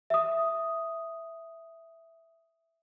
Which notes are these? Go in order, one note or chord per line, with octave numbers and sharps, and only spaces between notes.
E5 D#6